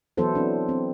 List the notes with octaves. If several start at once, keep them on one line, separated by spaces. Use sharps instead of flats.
E3 F#3 B3 E4 A4 C5
C4 D4
C4